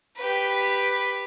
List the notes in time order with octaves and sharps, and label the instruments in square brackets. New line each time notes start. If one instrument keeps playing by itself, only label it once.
[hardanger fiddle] G4 B4